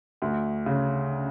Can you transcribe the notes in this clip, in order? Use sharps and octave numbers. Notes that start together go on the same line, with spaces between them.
D2
C#3